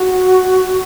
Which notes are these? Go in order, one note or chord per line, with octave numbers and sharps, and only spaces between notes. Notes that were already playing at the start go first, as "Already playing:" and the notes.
Already playing: F#4